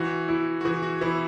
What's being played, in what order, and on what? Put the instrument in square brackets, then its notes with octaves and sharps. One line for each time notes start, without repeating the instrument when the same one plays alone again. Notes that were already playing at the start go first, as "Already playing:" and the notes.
Already playing: [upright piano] E3 [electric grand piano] F#4
[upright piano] E4
[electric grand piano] F#4
[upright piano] E3 [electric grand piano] G#4
[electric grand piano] F#4
[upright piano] E3 [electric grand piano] E4